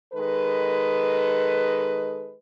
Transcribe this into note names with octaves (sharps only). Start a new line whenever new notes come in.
D#3 G#3 A4 B4